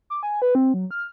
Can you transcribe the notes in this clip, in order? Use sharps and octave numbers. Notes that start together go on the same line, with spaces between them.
D6
G#5
B4
C4
F#3
F6